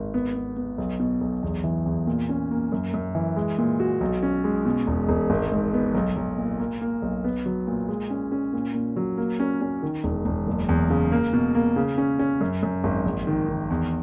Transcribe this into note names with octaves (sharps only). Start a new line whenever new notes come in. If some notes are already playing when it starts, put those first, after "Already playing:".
Already playing: G#1
B3
B3
B3
B1
B2
B1
E2
E3
E2
A#2
C#4
A#3
F#2
F#2
E3
G#3
A#2
F#4
B1
C#4
G#3
B2
E1
E1
G#1
G#2
B3
B1
B1
A#2
A#3
A#3
B1
B3
F#3
A#2
G#3
C#4
C#4
A#2
A#2
F#3
A#3
C#4
C#4
D#3
E1
E1
F#1
E2
C#3
A#3
B2
A#3
C#3
C#4
C#4
F#2
F#2
G#1
A#1
D#3
D#3
E2